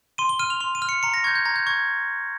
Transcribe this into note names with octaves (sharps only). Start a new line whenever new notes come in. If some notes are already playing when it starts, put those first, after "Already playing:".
C6 D#7
G7
F6 D#7
F7
C6 F7
D#7
F6
C#7
A#5 C#7
A#6
C#6 G6 G#6
G6
A#5 G#6
G6
C#6 G#6